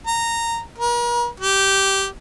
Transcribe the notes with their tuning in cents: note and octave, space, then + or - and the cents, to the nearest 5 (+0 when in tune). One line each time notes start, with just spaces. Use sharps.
A#5 -15
A#4 +45
G4 -10